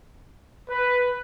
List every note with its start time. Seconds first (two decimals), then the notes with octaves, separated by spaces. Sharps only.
0.68 B4